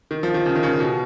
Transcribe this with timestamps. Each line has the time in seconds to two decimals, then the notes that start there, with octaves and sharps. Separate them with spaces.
0.11 D#3
0.23 F3
0.34 D#3
0.46 C#3
0.55 D#3
0.63 C#3
0.80 B2